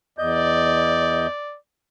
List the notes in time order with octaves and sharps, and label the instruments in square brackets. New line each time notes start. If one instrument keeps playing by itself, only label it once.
[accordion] E2 D#5 G6 [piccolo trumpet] D5